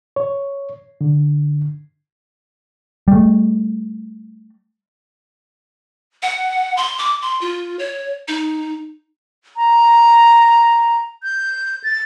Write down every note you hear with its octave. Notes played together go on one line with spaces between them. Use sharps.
C#5
D3
G3 A3
F#5
C6
D6
C6
F4
C#5
D#4
A#5
G6
A6